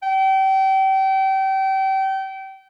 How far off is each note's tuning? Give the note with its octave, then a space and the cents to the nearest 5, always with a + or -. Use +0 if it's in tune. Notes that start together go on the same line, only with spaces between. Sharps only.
G5 -30